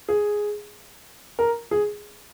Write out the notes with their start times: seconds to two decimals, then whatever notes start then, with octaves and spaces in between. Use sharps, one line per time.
0.08 G#4
1.39 A#4
1.71 G#4